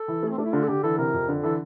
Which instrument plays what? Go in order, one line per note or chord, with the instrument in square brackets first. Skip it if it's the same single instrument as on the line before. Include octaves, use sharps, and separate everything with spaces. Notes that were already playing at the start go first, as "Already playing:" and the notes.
Already playing: [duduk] A4
[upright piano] E3
A3
[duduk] C4
[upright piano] A3 [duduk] D4
[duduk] E4
[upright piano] D3 [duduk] F4
[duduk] A4
[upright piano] D3 [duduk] G4
[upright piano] E3 [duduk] A4
[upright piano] C3 [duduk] A#4
[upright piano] F2
D3
[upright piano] E3 [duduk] A4